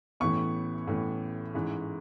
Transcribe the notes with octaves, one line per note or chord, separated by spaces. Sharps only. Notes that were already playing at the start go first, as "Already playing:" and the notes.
A1 A2 E3 B3 C#6
A1 A2 E3 B3
A1 G#2 E3